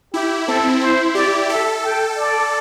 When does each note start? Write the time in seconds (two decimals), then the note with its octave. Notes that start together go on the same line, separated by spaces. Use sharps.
0.13 E4 G4
0.47 C4 A4
0.81 E4 C5
1.15 G4 D5
1.49 A4 E5
1.84 G5
2.17 D5